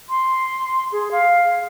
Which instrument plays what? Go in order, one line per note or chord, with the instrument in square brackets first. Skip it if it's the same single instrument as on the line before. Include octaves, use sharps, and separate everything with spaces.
[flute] C6
G#4
F5